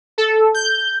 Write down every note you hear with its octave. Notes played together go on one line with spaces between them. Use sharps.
A4
G6